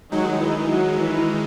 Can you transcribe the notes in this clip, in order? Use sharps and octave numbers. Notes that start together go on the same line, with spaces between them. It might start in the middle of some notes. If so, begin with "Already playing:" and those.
D#3 F#3 G#3 D#4
E3
F#3
E3